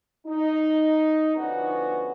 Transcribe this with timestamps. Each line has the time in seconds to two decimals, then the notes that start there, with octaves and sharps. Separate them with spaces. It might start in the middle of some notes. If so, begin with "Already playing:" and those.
0.26 D#4
1.36 D3 F3 B3 C#4 F#4 B4